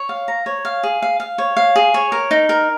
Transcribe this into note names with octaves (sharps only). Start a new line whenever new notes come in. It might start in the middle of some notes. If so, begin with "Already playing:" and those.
Already playing: C#5
F5
A#5
C#5
F5
G#4
F5
F5
C#5
F5
G#4
C#5
A#4
D#4
A#4